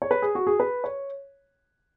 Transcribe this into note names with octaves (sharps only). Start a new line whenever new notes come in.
C#5
B4
G#4
F#4
G#4
B4
C#5